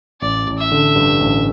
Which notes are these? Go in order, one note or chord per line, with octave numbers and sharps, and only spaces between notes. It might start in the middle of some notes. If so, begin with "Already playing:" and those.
A1 D5
A1
E5
D3
G2
A1